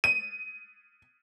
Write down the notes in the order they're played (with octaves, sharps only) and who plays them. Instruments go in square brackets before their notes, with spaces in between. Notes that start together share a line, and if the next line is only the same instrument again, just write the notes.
[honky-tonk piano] D#7